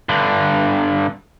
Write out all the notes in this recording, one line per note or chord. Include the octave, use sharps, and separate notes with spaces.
G2 D3